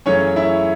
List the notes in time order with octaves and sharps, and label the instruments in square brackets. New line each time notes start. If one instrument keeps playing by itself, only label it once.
[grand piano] F#2 C#3 E3 A3 C#4 C#5
E4 E5